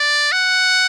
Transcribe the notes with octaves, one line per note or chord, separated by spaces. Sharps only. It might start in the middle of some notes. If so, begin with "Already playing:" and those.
Already playing: D5
F#5